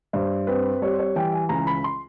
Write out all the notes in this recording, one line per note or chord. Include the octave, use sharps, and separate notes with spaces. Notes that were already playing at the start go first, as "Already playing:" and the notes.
G2 C5
C4 B4
G3 C#5
C5
C#5
E3 G5
G#5
C#2 A#5
B5
C6